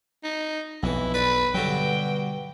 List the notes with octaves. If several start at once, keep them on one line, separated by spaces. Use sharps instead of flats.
D#4
B1 F2 E3 E4
B4 D5
G2 B2 D3 F#3 G5